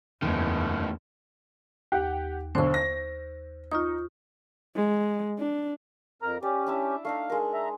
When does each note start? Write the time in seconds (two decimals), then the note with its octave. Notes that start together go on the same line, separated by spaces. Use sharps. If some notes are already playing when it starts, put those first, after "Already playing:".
0.22 F#1 E2 A2 D#3
1.92 D#2 G4 F#5
2.55 B1 D3 C5 C#6
2.74 A#6
3.71 D#4 F4 C#6 D#6
4.76 G#3
5.39 D4
6.22 F2 A#4 A#5
6.43 C#4 G4 D5
6.67 D4 E4 E5
7.05 A3 D4 D#4 F5
7.30 G#3 A#4
7.53 E5 A#5